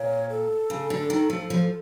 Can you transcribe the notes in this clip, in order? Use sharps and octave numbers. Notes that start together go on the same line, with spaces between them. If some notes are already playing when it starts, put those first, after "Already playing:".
Already playing: A#2 C#5
A4
C#3
D3
D#3
F3
F3